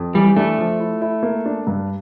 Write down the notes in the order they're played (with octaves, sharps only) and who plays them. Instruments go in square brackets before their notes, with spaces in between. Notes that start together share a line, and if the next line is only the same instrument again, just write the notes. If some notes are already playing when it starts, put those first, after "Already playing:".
Already playing: [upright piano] F2
[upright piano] E3 [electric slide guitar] G3
[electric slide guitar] A3 [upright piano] D4
[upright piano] F3
E4
E4
A#3
D4
G2